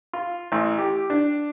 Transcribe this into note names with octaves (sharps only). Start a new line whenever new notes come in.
F4
A1
G4
D4